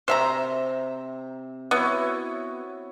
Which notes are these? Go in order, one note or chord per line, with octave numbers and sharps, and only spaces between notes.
C3 C5 E5 A#5
B3 E4 F#4 C#5